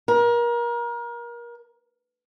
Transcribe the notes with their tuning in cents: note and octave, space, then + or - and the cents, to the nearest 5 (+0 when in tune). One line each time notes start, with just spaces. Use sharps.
A#4 +30